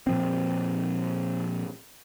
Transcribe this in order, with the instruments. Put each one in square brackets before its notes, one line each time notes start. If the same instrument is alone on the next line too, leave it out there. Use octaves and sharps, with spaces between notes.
[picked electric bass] A#2 F3 C4